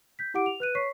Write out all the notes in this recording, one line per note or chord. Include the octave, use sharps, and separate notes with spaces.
G6 B6
E4 G4 F#5 D6 D7
F7
B4 F#6 D#7
C#5 C#6 B6 C7